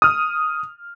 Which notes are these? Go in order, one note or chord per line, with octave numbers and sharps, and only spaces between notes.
D#6 F6